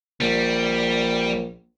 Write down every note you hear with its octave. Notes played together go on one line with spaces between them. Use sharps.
A#1 G3